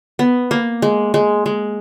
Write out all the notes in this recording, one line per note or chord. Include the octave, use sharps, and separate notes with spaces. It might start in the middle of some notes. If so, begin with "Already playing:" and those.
B3
A#3
G#3
G#3
G#3